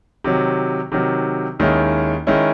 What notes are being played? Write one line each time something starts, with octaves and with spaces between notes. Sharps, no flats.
C3 D#3 F#3
C3 D#3 F#3
D#2 D#3 G#3 C#4 E4
D#3 G#3 C#4 E4